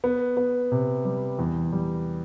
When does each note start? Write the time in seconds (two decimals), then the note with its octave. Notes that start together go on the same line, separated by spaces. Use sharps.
0.04 B3
0.37 B3
0.72 C3
1.05 G3
1.39 E2
1.72 G3